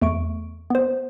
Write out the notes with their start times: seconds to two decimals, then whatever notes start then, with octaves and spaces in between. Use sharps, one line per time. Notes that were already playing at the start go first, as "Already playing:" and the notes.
0.01 E2 A3 C#6 D7
0.70 B3 C5